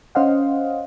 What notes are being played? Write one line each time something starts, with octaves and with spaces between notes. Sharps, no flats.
C#4 C5 D#5 F5 F#5